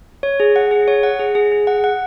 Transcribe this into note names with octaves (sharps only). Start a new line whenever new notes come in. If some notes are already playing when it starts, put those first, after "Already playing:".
C#5
G#4
F#5
G#4
C#5
F#5
G#4
G#4
G#4
F#5
F#5